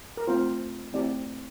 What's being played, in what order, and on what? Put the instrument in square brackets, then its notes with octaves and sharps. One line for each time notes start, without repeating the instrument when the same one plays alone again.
[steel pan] A#4
A3 C4 F4 C5
A3 C4 E4 G4 D5